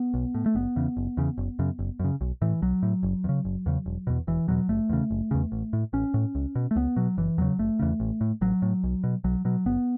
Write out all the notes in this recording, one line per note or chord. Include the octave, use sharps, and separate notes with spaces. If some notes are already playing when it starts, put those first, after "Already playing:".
Already playing: B3
B1
A2
A3
F#1 B3
E2 C#3
F#1
E2 C#3
F#1
F#2 C#3
F#1
F#2 C#3
B1
A2 E3
B1 F#3
A2
F#1
E2
C#3
F#1
E2 C#3
E1
E2 B2
E1 E3
E2 B2 F#3
F#1 A3
E2 C#3
F#1
E2 C#3
A1
A2
A1 C#4
A2
C#2
B2
A3
C#2 B3
B2 F#3
F#1 E3
E2 C#3 F#3
F#1 A3
E2 C#3
A1
A2
A1 F#3
A2
B1
B2
B1 F#3
B2 F#3
F#1 B3